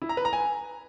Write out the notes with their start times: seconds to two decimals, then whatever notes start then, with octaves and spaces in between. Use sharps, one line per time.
0.02 E4
0.09 A#5
0.17 B4
0.25 A#5
0.33 G#5